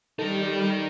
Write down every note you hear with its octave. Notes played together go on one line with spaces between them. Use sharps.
G3 D#4 A4 A#4